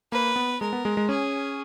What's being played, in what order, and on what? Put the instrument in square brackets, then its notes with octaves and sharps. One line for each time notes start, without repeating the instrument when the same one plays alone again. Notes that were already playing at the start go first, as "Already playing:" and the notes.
[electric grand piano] A#3 [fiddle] B4
[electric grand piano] B3
[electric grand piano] G#3 [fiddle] A#4
[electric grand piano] B3
G#3
G#3
[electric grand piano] C#4 [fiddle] G#4